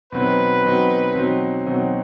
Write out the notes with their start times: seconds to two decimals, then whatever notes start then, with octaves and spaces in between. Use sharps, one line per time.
0.12 B2 F#3 C4 D#4 B4
0.64 B2 F#3 C4 D#4
1.14 B2 F#3 C4 D#4
1.66 B2 F#3 C4 D#4